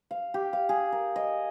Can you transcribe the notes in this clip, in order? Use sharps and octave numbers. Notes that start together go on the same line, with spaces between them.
F5
G4
F5
G#4
A#4
D#5